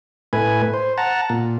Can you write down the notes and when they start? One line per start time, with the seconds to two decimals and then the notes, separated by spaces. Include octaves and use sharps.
0.33 A2 B4 G#5
0.74 C5
0.98 F#5 A5 A#5
1.29 A#2